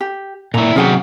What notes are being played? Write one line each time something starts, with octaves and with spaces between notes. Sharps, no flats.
G4
A#2 E4 A#5
C3 F#3 C#4 G4 G#4 F#5